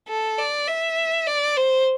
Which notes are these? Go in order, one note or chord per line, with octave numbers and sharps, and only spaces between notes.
A4
D5
E5
D5
C5